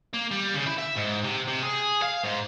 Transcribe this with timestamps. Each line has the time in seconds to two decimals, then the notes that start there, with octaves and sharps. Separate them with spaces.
0.13 A#3
0.31 G3
0.54 C#3
0.66 E4
0.78 E5
0.96 G#2
1.23 C3
1.47 C3
1.62 G#4
2.02 F5
2.24 G#2